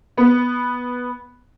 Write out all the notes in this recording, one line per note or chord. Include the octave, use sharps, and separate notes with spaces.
B3